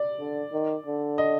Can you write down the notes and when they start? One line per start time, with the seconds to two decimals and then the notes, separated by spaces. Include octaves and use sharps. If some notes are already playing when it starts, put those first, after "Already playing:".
Already playing: D5
0.20 D3
0.53 D#3
0.86 D3
1.18 D#5